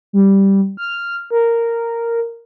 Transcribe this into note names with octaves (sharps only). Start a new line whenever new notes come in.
G3
F6
A#4